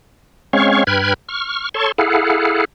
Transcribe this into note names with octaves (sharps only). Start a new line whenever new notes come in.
G#3 C4 C#4 C#5 F5 C#6
G2 B4 G5 B5 F6 G#6
C#6 F6
A4 C#5 A5 C6 C#6
E4 G#4 A4 F5 F#5